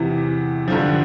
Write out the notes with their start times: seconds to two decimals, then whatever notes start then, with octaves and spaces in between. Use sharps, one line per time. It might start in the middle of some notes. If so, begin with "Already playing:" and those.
Already playing: E2 C3 E3
0.68 G2 D3 F3